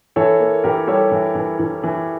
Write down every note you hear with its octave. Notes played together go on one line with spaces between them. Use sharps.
E3 A4 C#5
A#3
E3 G4 A#4
G3 A4 C#5
E3
E3
E3
E3